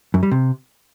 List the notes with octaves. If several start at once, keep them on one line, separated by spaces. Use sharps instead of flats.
F#2
G3
C3